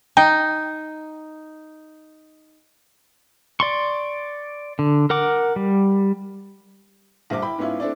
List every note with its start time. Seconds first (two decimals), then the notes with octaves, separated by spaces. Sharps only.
0.17 D#4 G5
3.60 D5 C6 C#6
4.79 D3
5.10 A#4 F#5 D6
5.56 G3
7.30 A#1 G2 C5 D6
7.42 E4 G5 B5
7.58 G#2 B3 C#4 E4 F4
7.80 A3 C4 D4 E4 D5